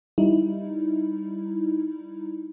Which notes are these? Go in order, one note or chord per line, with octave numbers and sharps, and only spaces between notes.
G3 D#4 E4